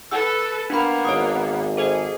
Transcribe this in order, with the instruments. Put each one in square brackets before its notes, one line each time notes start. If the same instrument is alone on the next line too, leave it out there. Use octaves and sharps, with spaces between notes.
[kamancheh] A4 B4 [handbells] E6
[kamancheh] A#3 B3 [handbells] D4 B5
[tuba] G#1 [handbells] C#5 D#6
[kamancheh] G#4 [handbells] A4 C5 D#5